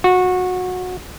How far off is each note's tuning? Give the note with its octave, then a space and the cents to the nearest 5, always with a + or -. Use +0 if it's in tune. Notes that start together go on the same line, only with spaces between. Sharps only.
F#4 -20